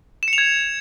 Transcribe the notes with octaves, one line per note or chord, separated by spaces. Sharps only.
E7
C#7
F7
G#6